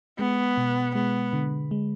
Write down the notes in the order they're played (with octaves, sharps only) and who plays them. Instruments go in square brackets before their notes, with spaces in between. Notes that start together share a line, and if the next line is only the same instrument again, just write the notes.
[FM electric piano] G#3 [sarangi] B3
[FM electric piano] B2
[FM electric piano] G#3 [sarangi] B3
[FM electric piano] D3
G#3